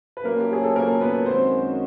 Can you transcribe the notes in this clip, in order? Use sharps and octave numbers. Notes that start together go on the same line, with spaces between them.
B4
A#2 F#3 A3 A#3 C#4 A#4
G4
G#4
A4
A#3 A#4
B3 B4
F#2 D#3 G#3 C4 C#4 F#4 C5